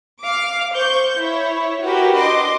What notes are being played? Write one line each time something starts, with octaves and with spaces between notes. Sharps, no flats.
F5 D6
C5 C#6 G6
E4 C#5
F#4 G4 A#4 B4
D4 D#5 C6 D6